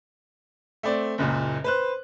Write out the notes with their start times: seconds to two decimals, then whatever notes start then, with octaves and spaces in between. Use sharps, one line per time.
0.83 A3 C4 D5
1.18 F#1 C#2 A#2
1.64 B4 C5 F#6